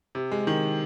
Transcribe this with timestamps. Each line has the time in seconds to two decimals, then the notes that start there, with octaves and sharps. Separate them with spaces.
0.15 C3
0.31 G#3
0.47 D#3